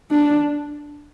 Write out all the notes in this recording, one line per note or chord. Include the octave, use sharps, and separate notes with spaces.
D4